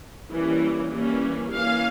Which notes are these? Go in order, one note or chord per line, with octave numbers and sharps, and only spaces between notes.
E3 G3 A#3 C#4
E3 G3 A#3 C#4
E3 A#3 C#4 F5